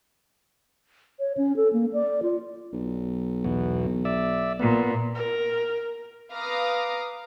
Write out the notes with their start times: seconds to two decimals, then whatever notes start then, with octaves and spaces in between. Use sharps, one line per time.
1.19 C#5
1.37 C#4
1.57 A4
1.73 A#3
1.93 D5
2.23 F4
2.72 B1
3.44 E2 B2
4.05 D5 E5
4.59 A#2 B3
5.15 A#4
6.32 B4 F5 A#5 D6 D#6